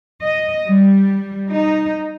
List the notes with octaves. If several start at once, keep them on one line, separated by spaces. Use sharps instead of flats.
D#5
G3
D#4